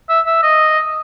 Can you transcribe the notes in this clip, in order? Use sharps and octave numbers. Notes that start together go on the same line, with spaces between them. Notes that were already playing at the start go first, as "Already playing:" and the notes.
E5
E5
D#5